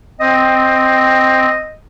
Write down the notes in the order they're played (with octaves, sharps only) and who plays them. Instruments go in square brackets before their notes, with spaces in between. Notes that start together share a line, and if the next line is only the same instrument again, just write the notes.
[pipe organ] C4 [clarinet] D#5